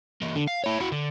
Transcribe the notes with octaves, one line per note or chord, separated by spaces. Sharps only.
E3 A#3
D3
F5
E4 C#5
E4 F#4
D3